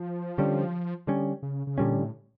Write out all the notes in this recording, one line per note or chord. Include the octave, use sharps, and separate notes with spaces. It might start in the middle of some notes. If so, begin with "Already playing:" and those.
Already playing: F3
D3 G3 C#4
D3 G3 C#4
C#3
C#3
A#2 D3 G3 C#4
A2